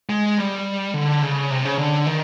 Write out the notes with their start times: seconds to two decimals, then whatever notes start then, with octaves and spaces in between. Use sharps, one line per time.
0.09 G#3
0.38 G3
0.94 D3
1.22 C#3
1.51 C3
1.65 C#3
1.78 D3
2.06 D#3